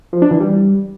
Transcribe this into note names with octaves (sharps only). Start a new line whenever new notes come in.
F3
D4
E3
G3